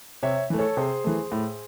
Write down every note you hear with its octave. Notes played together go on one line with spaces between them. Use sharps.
C3 C#5 E5
E3 A3
A4 C#5
C3 G#4 C5
E3 A3
A2